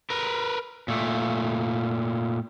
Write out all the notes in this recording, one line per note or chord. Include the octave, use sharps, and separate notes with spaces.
A#4 B4
A#2 A3